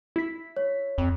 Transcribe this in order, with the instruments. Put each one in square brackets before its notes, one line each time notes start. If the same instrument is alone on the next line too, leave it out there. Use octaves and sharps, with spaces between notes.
[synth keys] E4 B6
[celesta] C#5
[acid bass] F2